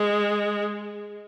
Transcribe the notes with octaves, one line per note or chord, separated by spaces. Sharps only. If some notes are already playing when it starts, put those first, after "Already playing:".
Already playing: G#3